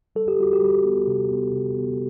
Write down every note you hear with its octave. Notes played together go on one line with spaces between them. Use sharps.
G3 A4
G4
G3 F#4
G4
G3
B3
C3
B3
C3
B3